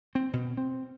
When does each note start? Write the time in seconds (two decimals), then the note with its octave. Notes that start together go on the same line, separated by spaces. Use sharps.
0.15 C4
0.33 B2
0.57 C4